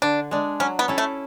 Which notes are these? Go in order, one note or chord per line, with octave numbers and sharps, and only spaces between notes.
D3 D4
G#3 D4
F#3 C#4
B3
C#4 E4 A4
A3